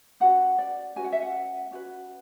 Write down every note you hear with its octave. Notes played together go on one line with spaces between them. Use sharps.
C#4 F#4 B4 F#5
D5
C#4 F#4 B4 G#5
F#5
E5
F#5
C#4 F#4 B4